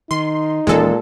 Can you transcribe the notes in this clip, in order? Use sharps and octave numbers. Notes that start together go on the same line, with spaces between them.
D#3 D#4 C6
D#1 A#2 E3 G#3 C#4 A4